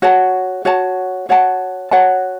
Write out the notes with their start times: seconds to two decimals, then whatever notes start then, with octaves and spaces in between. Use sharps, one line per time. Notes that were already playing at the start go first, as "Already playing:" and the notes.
0.02 F#4 C#5 F#5 A5
0.65 F#4 C#5 F#5 A5
1.29 F#4 C#5 F#5 A5
1.91 F#4 C#5 F#5 A5